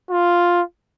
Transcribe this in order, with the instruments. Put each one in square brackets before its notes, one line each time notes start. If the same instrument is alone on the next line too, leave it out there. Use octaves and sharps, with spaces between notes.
[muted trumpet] F4